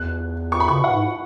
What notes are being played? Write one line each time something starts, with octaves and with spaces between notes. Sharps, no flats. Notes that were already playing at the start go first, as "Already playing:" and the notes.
Already playing: E2 F#6
C#6
B5
C#3 C#6
B2 F#5
G#2